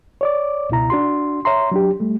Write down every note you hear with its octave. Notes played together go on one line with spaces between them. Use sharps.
C#5 D5 D6
C#2 B2 E4 A#5
D4 F#4 C6
C#5 E5 A#5 C6
F#3 D4 G4
G3 A3